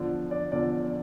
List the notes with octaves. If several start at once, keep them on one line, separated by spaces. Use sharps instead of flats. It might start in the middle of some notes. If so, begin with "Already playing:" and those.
Already playing: E2 D3 F3
D5
E2 D3 F3 D5